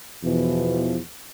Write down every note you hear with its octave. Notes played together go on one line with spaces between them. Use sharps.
E2 B2 E3 F3